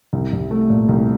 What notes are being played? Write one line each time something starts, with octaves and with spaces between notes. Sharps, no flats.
C2
C2
A3
A#2
C2